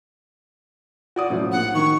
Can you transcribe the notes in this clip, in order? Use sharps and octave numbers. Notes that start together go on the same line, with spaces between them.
F#4 D5 D#6
F#2 A2 F3 F#3
A#1 F#5
D#3 C#6